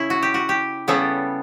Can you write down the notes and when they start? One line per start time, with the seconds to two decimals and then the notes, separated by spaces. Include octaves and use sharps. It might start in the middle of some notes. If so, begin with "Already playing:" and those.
Already playing: C#3 C#4 E4
0.10 F#4
0.23 G4
0.34 F#4
0.49 G4
0.88 C#3 G3 B3 A4